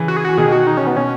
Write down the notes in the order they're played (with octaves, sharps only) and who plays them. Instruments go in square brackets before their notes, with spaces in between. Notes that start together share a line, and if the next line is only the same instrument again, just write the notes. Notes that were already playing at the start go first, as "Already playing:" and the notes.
Already playing: [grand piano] C#3 E3
[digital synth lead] F#4
G#4
[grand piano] E3 [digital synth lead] F#4
[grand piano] B2 D#3 [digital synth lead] G#4
[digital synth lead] F#4
D#4
C#4
B3
[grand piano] B2 [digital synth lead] C#4